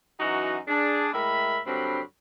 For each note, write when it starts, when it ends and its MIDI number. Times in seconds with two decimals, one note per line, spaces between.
0.20 0.58 42
0.20 0.58 52
0.20 0.58 63
0.20 0.58 66
0.68 1.09 62
0.68 1.09 68
1.13 1.60 45
1.13 1.60 56
1.13 1.60 70
1.13 1.60 76
1.13 1.60 83
1.66 2.01 43
1.66 2.01 50
1.66 2.01 54
1.66 2.01 60
1.66 2.01 83